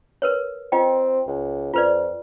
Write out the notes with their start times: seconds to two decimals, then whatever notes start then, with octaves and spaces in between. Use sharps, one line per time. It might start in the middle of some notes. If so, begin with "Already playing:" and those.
0.22 A#4 B4 C#5
0.72 C4 F4 D#5 G5
1.27 C#2
1.74 F2 F4 B4 D5